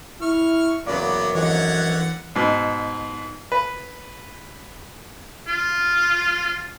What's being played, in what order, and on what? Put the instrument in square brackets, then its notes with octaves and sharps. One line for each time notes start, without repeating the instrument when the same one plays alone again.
[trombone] E4 [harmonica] C#6 F6
[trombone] F#2 [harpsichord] A#2 C#3 E3 [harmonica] F#3 B3 [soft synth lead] D6
[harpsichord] F2 G#2 [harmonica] D3 C#5 F#5 [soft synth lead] E3
[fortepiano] G#2 B2
B4
[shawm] F4